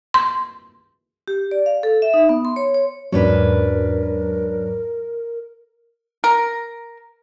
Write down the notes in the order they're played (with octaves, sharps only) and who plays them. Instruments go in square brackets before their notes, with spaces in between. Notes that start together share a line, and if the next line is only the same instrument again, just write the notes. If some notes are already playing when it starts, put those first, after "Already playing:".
[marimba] C6
[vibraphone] G4
D5
F5
A4
E5
D#4
B3
C6
C#5
C#5
[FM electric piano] E2 G#2 F#3 [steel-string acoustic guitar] C#4 D4 B4 [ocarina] A#4
[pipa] A#4